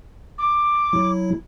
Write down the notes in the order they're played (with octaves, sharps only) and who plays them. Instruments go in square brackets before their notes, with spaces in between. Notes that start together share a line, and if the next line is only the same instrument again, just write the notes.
[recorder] D6
[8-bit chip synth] F#3 E4